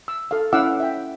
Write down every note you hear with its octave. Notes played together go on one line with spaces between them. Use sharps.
E6
A4 F5
C#4 E4 F5 F#5 D6 E6
E5 G5